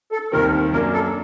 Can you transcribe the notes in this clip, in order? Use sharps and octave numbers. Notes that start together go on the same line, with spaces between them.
A4
D#2 D#3 G3 C4 A#4
F#2 F#3 A#3 D4 A#4
A4